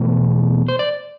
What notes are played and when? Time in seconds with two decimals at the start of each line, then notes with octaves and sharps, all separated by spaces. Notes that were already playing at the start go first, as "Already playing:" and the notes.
Already playing: E2 B2 A3
0.68 C5
0.79 D5